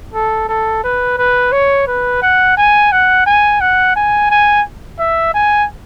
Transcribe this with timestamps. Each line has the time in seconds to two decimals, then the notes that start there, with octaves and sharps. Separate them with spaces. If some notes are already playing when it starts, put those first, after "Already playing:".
0.14 A4
0.49 A4
0.84 B4
1.18 B4
1.52 C#5
1.87 B4
2.22 F#5
2.58 G#5
2.92 F#5
3.26 G#5
3.61 F#5
3.96 G#5
4.31 G#5
5.00 E5
5.34 G#5